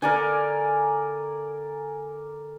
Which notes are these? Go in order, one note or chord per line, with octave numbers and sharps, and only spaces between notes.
D3 A#4 D5 G#5